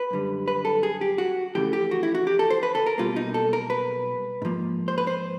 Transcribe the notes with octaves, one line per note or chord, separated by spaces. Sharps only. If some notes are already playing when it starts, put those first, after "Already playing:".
Already playing: B4
F#2 D3 G3
B4
A4
G#4
G4
F#4
F2 C#3 E3 A3 G4
G4
F#4
E4
F#4
G4
A4
C5
B4
A4
A#4
B1 B2 G3 A#3 F4
D#4
A4
A#4
B4
G#2 F3 A#3
C5
B4
C5